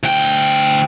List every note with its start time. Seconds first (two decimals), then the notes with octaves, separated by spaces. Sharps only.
0.03 D2 G5